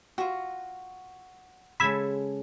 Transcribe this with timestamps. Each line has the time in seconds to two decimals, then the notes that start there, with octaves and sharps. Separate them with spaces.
0.18 F4 F#4 E5
1.80 C#3 G#3 A4 B5 E6 G#6